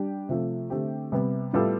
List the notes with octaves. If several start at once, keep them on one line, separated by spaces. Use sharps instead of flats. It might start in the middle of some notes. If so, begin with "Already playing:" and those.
Already playing: G3 D4 G4
C3 F3 A3
D3 A3 C4 G4
C3 G3 B3
A2 G3 B3 F4 A4